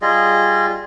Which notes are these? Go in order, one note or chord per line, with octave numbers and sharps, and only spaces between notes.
G3 F4 G#4 D#5